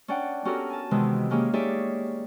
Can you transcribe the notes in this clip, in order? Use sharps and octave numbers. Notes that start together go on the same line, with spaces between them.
C#4 D4 D5 F#5 G5
B3 C#4 F#4 G4 A4 A#4
G#5 A5
C3 D#3 E3 G#3 B3
G#3 A#3 C#4 G4 G#4
D#4 G4 G#4 C#5 D5 E5